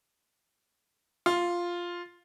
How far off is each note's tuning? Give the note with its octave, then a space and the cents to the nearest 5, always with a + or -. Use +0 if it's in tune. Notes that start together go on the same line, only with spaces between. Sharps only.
F4 +0